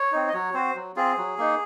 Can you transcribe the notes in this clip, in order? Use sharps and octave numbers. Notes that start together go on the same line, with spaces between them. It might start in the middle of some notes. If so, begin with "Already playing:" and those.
Already playing: C#5
C4 D#4
D#5
F#3 C#5
C4 F#4 C5
F#3
C4 F4 G#4
F#3
A#3 D#4